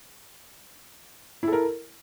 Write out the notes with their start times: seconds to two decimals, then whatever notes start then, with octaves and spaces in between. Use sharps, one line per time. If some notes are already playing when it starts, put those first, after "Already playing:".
1.43 E4
1.48 A4
1.53 A#4